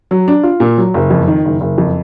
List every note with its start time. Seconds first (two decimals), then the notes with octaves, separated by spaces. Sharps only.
0.11 F#3
0.28 D4
0.43 F4
0.60 A#2
0.78 F#3
0.94 F#1
1.10 F2
1.28 D#3
1.45 F#1
1.61 F#1
1.78 F2